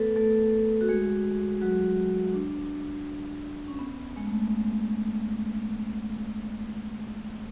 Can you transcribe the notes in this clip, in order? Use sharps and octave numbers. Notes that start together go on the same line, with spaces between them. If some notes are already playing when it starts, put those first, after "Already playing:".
Already playing: A3 B3 A4 B4
A3 A4
F#4
G#3 G#4
F#3 F#4
D4
C#4
B3
G#3
A3